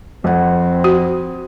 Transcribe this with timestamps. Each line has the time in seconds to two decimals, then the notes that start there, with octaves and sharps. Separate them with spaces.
0.24 F2 C4 F#5
0.84 F#4